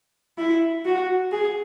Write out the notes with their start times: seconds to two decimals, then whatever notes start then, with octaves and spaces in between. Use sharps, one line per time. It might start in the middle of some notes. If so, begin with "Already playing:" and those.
0.38 E4
0.85 F#4
1.31 G#4